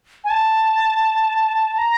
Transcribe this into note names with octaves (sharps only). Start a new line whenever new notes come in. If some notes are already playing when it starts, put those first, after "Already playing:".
G#5
A5
A#5